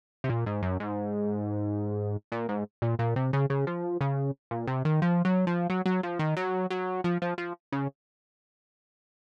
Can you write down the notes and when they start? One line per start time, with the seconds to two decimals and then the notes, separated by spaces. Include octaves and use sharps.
0.24 C3
0.29 A#2
0.46 G#2
0.62 F#2
0.80 G#2
2.32 A#2
2.49 G#2
2.82 A#2
2.99 A#2
3.16 C3
3.33 C#3
3.50 C#3
3.67 F3
4.01 C#3
4.51 A#2
4.67 C3
4.85 D#3
5.02 F3
5.25 F#3
5.47 F3
5.70 F#3
5.86 F#3
6.03 F3
6.19 D#3
6.37 F#3
6.70 F#3
7.04 F3
7.22 F3
7.38 F3
7.72 C#3